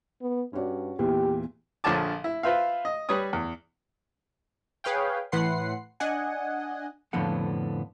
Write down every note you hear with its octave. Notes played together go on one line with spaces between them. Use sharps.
B3
G2 C#4 F#4 D5
E2 A#2 E3 G4
A#1 D3 F3 C#5 A5 D6
E4
F4 B4 C5 E5 F5
D#5
G3 B4 C#5 C#6 D#6
E2
G#4 B4 C#5 F5 G5
A2 E3 B4 F#5 C6 C7
D4 D#5 F#5 G#5
F2 A2 D3 F3 B3 F#5